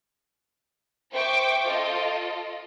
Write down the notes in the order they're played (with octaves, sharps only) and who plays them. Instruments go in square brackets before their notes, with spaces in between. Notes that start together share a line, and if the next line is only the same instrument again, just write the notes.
[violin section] C5 E5 G5 C#6 D6
F4 A4 D#5